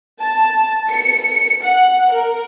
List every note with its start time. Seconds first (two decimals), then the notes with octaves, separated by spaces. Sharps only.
0.21 A5
0.90 C#7
1.66 F#5
2.14 A#4